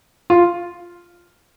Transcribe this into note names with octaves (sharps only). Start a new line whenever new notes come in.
F4